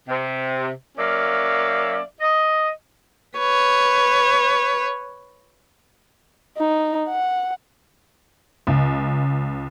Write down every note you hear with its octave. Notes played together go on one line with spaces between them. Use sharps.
C3
F#3 A#3 C#4 D5 E5 F5
D#5
B4 C#5
D#4
F#5
C#2